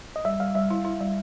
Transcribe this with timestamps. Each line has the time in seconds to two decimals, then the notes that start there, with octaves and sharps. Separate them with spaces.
0.16 D#5
0.25 G3 E5
0.40 G3 F5
0.55 G3 E5
0.70 E4
0.85 E4
1.01 G3